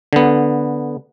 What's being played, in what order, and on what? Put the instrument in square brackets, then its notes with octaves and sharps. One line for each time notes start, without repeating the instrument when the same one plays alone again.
[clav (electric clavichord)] D3 B3